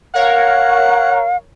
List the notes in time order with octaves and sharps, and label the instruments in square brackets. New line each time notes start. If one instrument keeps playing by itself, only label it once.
[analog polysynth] A#4 C#5 [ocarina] F5 [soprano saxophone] F#5